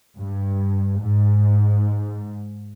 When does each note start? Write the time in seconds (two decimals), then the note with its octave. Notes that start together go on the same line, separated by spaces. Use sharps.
0.17 G2
1.00 G#2